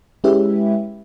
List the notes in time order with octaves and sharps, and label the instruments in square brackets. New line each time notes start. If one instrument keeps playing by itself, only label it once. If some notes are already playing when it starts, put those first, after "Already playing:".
[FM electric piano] G#3 C#4 E4 G4 B4 E5